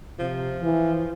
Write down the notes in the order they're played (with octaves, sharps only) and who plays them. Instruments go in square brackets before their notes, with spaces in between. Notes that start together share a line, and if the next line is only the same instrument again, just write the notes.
[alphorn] C3 [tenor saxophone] F3
[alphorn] E3